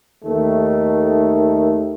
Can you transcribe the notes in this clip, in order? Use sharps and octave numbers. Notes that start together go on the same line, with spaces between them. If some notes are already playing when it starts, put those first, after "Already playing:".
D#2 D#3 A3